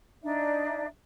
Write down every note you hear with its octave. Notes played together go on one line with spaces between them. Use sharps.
D4 D#4 D5 E5